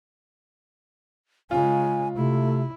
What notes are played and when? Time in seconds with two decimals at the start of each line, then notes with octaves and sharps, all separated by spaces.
1.51 C#3 G#3 F4 G#5
2.16 C3 A3 E4